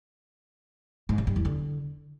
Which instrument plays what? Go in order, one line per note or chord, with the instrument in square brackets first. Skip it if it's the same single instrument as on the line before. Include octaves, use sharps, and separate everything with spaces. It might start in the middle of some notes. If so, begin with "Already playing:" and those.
[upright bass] G#2
C#3
G2
E2
D3